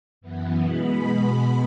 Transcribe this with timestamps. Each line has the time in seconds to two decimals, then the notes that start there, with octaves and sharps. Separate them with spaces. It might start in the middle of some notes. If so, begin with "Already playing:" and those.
0.21 F#2 E3 B3
0.63 B2 G#3 B3 B5
1.06 B2 G#3 B3